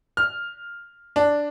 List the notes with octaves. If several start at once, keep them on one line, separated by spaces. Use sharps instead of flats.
F6
D4